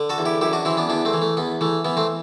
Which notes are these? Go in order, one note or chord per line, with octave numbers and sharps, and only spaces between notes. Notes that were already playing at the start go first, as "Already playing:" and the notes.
Already playing: D3
F#4 A4
E2
E4 G4
F#2 E4 G4
D4 F#4
E3 C4 E4
B3 D4
E2 B3 D4
A3 C4
E3
A3
E2 B3
E3 A3
E3 B3
A3 C4